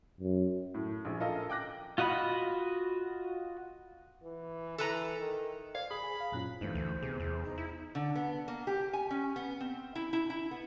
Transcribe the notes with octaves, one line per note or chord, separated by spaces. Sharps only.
F#2
A2
A#1 G#4
F4 A4 A#4 D#5
G5 D6 F#6 A#6
F4 F#4 D#5 F#5 B5
E3
E3 A4 B4 A#5
D#3
C5 D5 F5 G#6
G#4 B5 D#6
G#5
F5
F#2 A#2 C#4 F4 A#5 F#6
G2 E3 A3 D#4 C5
D2
C3 B3 G#4
E2
D#4
E4
D3
B3
A#3
G4
G#5
C#4
B3
C4
E4
E4
E4
B3